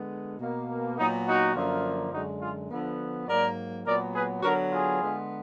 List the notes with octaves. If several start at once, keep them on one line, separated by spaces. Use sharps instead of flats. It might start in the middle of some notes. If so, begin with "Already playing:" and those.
Already playing: D3 G#3 B3
B2 A#3
A#2 F#3 B3 D#4
D#4 F#4
F#2 D3 F3 A#3
F#2 D3 G#3 D#4 F#4
F4 G#4
D3 F3 B3
G#2 F#3 A#3 A#4 D5
A#2 F#3 B3 A#4 D5
G#4 B4
D3 F#3 B3 F#4 A#4
F4 G#4
D3 G#3 B3